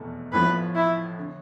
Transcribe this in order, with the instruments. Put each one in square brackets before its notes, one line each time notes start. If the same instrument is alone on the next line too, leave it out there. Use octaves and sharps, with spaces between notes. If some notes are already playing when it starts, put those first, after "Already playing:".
Already playing: [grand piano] F1 E2 B2 A3
[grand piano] A1 A2 F3 B3 [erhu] B4
[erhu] E4
[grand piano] D3